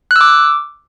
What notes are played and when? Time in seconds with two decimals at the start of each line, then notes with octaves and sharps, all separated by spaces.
0.11 F#6
0.16 E6
0.21 D6